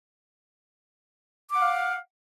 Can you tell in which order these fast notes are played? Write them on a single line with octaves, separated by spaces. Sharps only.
D6 F#5 F5